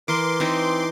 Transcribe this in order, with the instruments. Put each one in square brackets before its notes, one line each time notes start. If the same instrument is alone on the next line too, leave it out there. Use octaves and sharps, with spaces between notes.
[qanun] E3 [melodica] A#4 [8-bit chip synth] C6 D6
[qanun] E3 D#4 [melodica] C4